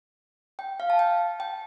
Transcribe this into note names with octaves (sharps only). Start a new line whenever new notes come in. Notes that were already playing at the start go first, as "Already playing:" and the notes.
G5
F5
A5
G5
G5